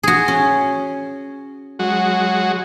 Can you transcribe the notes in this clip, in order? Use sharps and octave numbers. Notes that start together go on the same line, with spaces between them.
F#4 G#4
C#4
F#3 G#3 F#4